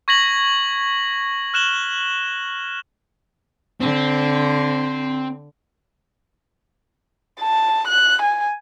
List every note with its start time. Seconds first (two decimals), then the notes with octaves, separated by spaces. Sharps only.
0.08 C#6 G#6 A#6 B6 F#7
1.54 F6 F#6 E7 F#7 G7
3.81 D3 C4
7.41 A5
7.88 F#6
8.22 G#5